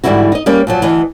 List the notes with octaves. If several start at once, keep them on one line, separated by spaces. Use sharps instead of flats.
G#2 D3 E3 G3 E4 F#4
D#4 D#5
G3 A#3 C#4
A#2 F3 F#3
D2 E3 D#5